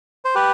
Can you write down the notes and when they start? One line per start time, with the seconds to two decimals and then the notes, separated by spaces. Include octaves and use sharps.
0.25 C5
0.35 G4 B4